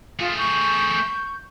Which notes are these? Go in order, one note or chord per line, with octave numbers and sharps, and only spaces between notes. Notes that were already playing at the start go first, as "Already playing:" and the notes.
A3 F4 G#4
C#6 G6